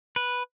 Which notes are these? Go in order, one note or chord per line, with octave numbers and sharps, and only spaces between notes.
B4